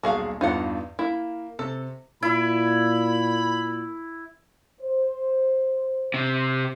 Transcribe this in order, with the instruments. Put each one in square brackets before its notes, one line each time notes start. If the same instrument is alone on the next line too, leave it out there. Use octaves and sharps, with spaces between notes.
[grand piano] D#1 B1 A5 [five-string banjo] F#4 G#4 F5
[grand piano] E2 G2 [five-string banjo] D#4 F4 F#5
[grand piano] A#3 [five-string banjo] E4
[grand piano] C3 [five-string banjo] A4
[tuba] A#2 [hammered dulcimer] E4 [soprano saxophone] B5
[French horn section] C5
[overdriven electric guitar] C3